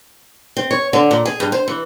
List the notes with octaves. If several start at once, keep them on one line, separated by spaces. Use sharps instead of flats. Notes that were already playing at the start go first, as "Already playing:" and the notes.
C4
C#5
D3
A#2
G#4
G2
C5
E3